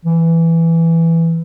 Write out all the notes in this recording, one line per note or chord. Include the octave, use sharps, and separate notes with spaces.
E3